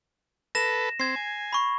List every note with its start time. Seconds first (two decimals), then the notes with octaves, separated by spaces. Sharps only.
0.55 A4 B4 A#6 E7
1.00 C4 G#6 C7
1.16 G#5
1.53 B5 C#6